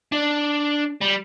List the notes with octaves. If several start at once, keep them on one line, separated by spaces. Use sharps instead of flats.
D4
G3